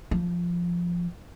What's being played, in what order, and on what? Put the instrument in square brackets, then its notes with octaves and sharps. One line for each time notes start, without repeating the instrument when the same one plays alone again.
[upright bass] F3